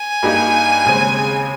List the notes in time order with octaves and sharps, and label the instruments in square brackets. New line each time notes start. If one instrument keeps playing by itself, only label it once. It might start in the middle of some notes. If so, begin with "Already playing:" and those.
Already playing: [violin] G#5
[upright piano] G2 G3 A#3 D#4 G4
D#2 C#3 G#3 C4